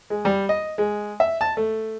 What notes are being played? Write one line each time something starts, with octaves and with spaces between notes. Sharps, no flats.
G#3
G3
D#5
G#3
E5
A5
A3